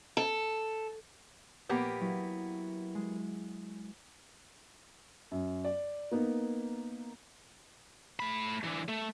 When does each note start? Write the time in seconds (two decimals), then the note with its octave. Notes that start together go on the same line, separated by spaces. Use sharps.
0.17 A4
1.69 A#1 A#3 B3 G4
2.01 F#3 E4 B4
2.95 G#3
5.31 F#2
5.64 D5
6.11 A#3 B3 D#4
8.20 A3 B5
8.63 D3 E3
8.88 A3